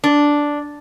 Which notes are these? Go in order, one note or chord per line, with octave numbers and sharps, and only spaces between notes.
D4